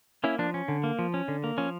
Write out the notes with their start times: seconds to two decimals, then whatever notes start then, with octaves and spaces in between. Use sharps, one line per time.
0.24 A#3 C#4 E4
0.39 F3 D4
0.54 C#4
0.68 D3
0.84 A#3
0.99 F3
1.14 C#4
1.28 D3
1.44 A#3
1.58 F3 C#4